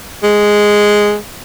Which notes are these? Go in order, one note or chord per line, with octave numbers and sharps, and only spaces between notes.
G#3